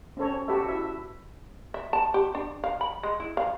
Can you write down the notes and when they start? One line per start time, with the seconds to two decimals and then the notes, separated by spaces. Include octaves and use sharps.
0.17 C4 C#4 A4 C#5
0.48 F#4 G4 A4 B4 E5
0.68 E4 E5
1.74 E5
1.93 A5
2.14 G4
2.35 D4
2.64 F5
2.81 B5
3.03 G#3
3.20 E4
3.37 F5